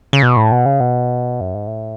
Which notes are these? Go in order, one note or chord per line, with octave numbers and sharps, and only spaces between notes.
C#3
B2
A2
B2
C#3
B2
F#2
G#2
A2